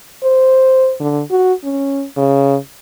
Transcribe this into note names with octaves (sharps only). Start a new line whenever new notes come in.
C5
D3
F#4
C#4
C#3